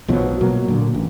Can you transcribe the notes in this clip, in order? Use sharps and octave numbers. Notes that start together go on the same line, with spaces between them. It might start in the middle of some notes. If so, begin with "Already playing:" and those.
B1 B2 F3 F#3
B2 F#3 A#3
A#2 D3
A1